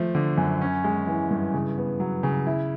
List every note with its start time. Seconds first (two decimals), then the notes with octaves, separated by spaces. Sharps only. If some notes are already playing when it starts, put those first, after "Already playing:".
Already playing: F3 A3
0.15 D3
0.38 F#2
0.61 C#4
0.84 G#3
1.07 E3
1.31 G2
1.54 C#3
1.78 B3
2.00 F#3
2.23 C#3
2.46 E4